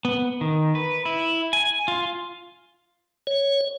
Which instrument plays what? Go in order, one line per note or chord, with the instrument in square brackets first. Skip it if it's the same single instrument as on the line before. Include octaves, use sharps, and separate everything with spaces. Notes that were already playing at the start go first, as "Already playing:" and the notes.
[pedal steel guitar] B3
D#3
B4
E4
G#5
F4
[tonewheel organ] C#5